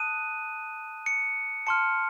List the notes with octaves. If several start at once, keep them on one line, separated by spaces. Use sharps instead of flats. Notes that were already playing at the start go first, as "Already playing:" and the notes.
Already playing: A5 D#6 F#6 D#7
C#7
A5 C6 F6 C#7